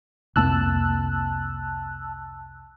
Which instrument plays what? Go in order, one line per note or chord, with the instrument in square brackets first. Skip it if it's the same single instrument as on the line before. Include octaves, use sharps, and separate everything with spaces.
[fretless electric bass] C2 F2 A#3 [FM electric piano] A5 E6 F#6